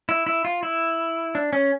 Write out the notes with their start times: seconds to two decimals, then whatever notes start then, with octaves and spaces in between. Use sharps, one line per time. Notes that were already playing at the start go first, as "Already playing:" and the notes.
0.09 E4
0.27 E4
0.45 F4
0.63 E4
1.35 D4
1.53 C#4